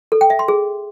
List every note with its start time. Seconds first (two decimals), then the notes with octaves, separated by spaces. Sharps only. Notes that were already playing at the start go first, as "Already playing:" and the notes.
0.12 A4
0.21 G5
0.30 E5
0.39 C6
0.48 G#4